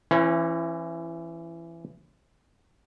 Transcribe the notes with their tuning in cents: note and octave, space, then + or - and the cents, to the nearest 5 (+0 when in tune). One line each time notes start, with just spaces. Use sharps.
E3 +20 C#4 -30 E4 +30